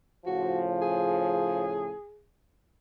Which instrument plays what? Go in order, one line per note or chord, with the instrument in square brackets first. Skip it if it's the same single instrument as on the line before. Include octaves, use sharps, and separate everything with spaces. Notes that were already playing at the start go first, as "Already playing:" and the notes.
[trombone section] A2 C#3 F3 [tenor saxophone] F#4
[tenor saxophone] G#4